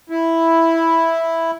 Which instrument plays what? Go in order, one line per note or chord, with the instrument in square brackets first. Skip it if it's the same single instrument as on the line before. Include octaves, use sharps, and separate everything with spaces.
[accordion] E4